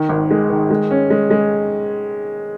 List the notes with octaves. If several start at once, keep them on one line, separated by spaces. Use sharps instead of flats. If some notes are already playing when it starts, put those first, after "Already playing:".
Already playing: D#3
G#1
G#3
D#3
G#3
C#4
G#3
G#3